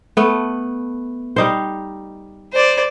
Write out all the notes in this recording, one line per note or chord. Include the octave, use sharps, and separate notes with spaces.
A3 B3
G3 D#4 C5
C5 D5